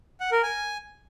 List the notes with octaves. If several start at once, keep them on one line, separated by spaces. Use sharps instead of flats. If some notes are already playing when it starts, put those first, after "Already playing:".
F#5
A#4
G#5